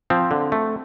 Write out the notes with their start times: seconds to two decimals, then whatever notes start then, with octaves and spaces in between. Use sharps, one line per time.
0.10 F3 C4
0.31 D3
0.52 A3